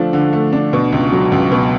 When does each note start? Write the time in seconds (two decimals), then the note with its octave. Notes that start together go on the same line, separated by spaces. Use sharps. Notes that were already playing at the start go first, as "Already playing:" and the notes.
Already playing: D3 F3 A3 D4
0.13 D3
0.33 A3
0.53 D4
0.73 B2
0.92 C#2
1.12 F#3
1.32 C#2
1.52 B2